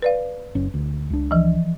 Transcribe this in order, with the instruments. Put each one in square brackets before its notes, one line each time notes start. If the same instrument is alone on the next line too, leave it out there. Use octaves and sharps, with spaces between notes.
[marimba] B4 D5 F5
[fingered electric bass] F#1 C#4
D2
C#2 D4
[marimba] E3 F3